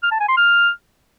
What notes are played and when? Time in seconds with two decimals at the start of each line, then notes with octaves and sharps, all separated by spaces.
0.03 F6
0.12 A5
0.20 G#5
0.29 C6
0.37 F6